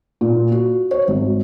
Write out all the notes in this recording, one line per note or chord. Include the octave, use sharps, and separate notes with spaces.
A#2
F#4
C#5
G#1